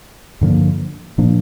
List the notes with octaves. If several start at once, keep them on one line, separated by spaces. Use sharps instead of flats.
G2 D3 F3 A#3
A#2 F3 A#3 D4